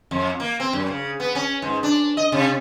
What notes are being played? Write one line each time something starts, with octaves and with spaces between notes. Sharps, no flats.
F2
A#3
C4
F#2
C#3
B3
C#4
G#2
D4
D#5
C3